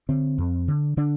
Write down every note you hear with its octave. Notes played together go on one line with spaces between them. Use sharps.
D3 C4
F2
D3
D3 D4